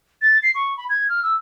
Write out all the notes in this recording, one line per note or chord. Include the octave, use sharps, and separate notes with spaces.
A6
C7
C#6
B5
G#6
F6
E6